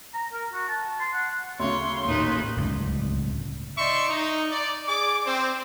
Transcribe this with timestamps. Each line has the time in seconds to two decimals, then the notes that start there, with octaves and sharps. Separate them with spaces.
0.14 A#5
0.33 A#4
0.53 F#4
0.69 A5
1.00 C6
1.13 F#5
1.60 D2 C#3 C#5 C6
2.06 A1 D#2 A#2 D#4 B4
2.57 D1 C#2 G2
3.77 D#4 D5 E5 C6 C#6
4.09 D#4
4.50 D5
4.87 G#4 D5 D6
5.26 C4